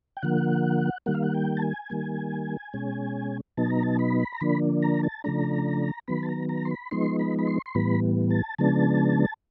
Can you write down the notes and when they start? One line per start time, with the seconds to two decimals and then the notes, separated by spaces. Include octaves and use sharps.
0.17 G5
0.23 D3 F3 A#3 F#5
1.06 D#3 G3 A#3 F#5
1.14 F5
1.23 F#5
1.34 G5
1.57 A5
1.62 G#5
1.90 D#3 G3 A#3
2.74 B2 G#3 C#4
3.57 B2 F#3 B3 D#4 A5
3.70 A#5
3.83 A5
3.99 B5
4.32 A#5
4.41 D3 F3 A#3 D4 B5
4.82 A#5
5.03 A5
5.24 C#3 F3 A3 D4 A#5
6.08 D#3 F#3 B3 B5
6.23 A5
6.29 A#5
6.49 A#5
6.65 C6
6.71 B5
6.91 F3 G#3 B3 D#4 C6
7.19 B5
7.39 B5
7.47 C6
7.66 C6
7.75 A2 E3 G3 B3 B5
8.30 A5
8.58 C#3 F3 G#3 B3 D4 A5